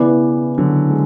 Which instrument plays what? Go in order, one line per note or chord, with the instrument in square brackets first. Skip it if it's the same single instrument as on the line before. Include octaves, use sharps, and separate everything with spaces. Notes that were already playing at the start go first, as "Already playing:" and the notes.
Already playing: [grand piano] C#3 E3 [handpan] B3 E4 B4 D5
[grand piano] D3 F#3
G#3